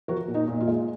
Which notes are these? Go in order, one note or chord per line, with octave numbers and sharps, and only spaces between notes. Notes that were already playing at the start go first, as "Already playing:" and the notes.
F3 F#4 A#4
A#2
D#4
A#2
F4
G#3